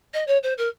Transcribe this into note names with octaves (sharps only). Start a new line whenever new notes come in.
D#5
C#5
C5
A#4